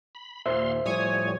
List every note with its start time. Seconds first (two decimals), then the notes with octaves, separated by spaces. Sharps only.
0.15 B5
0.46 D#2 A#2 C5 E5 F5 C6
0.86 A2 F3 G3 C#5 G#5 D#6